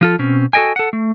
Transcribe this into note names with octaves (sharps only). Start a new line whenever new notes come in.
F3 F4 A4
B2 C4 C#4
F#4 A4 A#4 D#5 G5 G#5
A4 F#5
A3